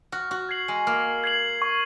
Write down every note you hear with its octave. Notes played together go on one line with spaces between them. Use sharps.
F#4 F6
F#4
G#6 C7 F#7
G#3
A#3 F6
G#6 C7 F#7
C#6